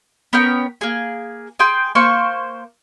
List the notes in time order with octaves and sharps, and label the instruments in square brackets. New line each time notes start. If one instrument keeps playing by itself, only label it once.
[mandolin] B3 C#4 A#4 G5
A#3 G#4
G#4 G5 C6 G6
A#3 C5 C#6